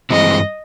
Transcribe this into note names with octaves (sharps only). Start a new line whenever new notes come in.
G2 E3 G#3 C4 D#5